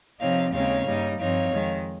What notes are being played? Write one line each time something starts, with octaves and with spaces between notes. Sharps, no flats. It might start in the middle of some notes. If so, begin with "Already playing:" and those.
C3 F3 C4 D#4 C#5 F5
D#2 C#3 G#3 C4 D#4 C#5 F5
G2 G3 A#3 D#4
G2 F3 C4 D#4 C#5 F5
F2 D#3 G#3